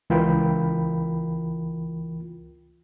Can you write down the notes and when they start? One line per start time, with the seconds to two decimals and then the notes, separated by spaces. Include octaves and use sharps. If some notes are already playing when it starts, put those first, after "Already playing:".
0.10 C#2 E3 F4 A#4 G5 B5